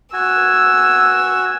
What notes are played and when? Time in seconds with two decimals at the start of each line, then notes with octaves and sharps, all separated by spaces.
0.13 F#4 G#5 E6